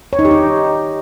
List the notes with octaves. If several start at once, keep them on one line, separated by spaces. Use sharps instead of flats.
C#5
D#4
G4
D#4